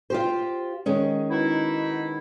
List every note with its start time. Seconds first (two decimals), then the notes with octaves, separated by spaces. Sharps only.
0.10 F4 G4 C5
0.86 D#3 G#3 C#4
1.29 B2 D#4 E4